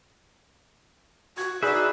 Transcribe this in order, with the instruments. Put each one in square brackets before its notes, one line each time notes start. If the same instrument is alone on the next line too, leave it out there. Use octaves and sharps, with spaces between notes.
[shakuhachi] F#4 [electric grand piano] G#6
[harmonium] D#4 E4 F#4 [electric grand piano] G#4 G6 [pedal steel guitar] B4 E5 [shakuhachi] D5